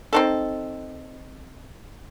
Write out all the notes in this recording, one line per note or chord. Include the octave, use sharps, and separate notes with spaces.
C4 D#4 A4